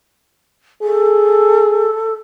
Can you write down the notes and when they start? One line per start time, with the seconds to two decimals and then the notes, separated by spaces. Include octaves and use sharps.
0.82 G#4 A4